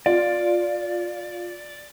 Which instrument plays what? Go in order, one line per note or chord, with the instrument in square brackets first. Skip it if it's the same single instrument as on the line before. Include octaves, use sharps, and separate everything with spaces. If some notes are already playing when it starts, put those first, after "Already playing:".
[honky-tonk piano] F4 [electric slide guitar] D5